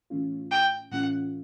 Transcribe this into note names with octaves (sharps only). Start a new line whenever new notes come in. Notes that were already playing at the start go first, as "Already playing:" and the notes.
A2 E3 A3 C#4 F4
G5
A2 E3 A3 C#4 F4 F#5